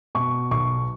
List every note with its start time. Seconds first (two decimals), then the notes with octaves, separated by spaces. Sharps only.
0.15 B2 C#6
0.51 B1 C#6